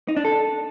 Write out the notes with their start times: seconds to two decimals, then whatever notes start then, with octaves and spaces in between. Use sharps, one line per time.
0.08 D#4
0.17 D4
0.25 A4